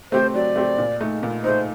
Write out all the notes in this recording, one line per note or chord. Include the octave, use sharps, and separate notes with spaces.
A3 C4 G4 C5
F#3 D5
A3 C4 G4
A#2
A3 D#4
A#2
A3 D#4 C5